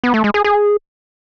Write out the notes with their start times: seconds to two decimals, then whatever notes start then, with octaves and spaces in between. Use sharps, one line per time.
0.04 B3
0.14 A3
0.24 G#3
0.34 G#4
0.44 G#4